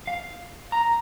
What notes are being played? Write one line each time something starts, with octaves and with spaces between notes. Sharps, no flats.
F5
A#5